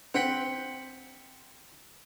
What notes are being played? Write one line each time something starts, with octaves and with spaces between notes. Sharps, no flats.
C4 F#5 G5 B5